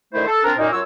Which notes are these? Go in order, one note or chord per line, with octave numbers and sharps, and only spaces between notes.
D3 D#3 A3 E4 C5
A4
C4 D4 F4 A#4
F#2 A#2 A#3 D#4
F#2 F#3 F4 F#4 C#5 E6